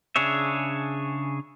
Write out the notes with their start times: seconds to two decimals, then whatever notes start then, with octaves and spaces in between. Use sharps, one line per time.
0.16 C#3 D4 G#4 C#5 E5